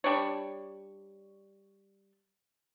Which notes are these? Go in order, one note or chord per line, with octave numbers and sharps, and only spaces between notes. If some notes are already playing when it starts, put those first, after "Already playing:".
G3 D4 C#5